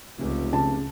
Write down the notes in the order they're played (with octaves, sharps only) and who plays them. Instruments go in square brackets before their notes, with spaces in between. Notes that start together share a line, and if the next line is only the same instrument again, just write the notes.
[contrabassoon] F1 [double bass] C#2
[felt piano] C#3 A5